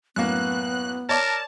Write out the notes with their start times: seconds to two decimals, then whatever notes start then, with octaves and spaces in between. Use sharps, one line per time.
0.16 F#2 A2 A#3 B3 F#6
1.09 A#4 C#5 D5 A5